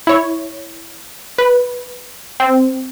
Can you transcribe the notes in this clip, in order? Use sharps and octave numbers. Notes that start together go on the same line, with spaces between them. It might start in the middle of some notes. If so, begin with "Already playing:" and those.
E4 C#5
B4
C4